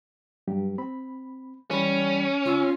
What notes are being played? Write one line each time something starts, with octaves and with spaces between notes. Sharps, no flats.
G2 F#3 G4
C4 B5
E3 G3 C#4 B5
C#2 F4 C#6 E6